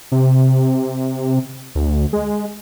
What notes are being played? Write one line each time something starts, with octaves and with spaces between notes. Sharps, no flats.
C3
D2
G#3